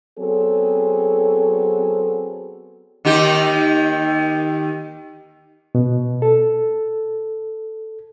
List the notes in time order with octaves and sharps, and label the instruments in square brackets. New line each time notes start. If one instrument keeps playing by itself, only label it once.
[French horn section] F#3 B3 C4 G#4 A4
[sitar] D#2 D#3 G4
[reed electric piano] B2
A4